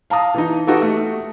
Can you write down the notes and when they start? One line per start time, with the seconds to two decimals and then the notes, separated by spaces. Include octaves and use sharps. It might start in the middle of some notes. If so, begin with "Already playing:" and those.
0.10 F5 A5 A#5 D#6
0.35 E3 D#4
0.67 D#4 F#4 G4 A4 B4
0.82 A3